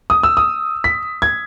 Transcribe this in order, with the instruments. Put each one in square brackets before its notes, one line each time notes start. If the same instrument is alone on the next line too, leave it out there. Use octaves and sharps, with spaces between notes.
[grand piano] D#6
E6
D#6
B6
G#6